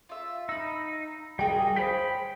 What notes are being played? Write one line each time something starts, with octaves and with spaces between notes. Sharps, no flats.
F4 E5
D#4 B5 E6
G3 F#4 G#4 A#4 D#5 G5
G#4 C5 C#5 F5 G5 B5 B6